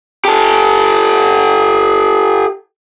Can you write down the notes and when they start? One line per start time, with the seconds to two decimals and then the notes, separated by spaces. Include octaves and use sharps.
0.25 G4 A4